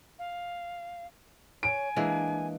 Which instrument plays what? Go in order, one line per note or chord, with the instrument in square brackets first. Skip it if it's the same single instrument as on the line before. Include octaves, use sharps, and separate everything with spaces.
[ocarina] F5
[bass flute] C#5 [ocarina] G#5 [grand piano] D7
[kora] E3 G#3 A#3 [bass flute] D4